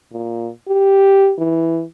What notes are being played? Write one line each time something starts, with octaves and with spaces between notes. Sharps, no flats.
A#2
G4
E3